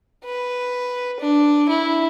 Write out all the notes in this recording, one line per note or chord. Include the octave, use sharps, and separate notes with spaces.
B4
D4
E4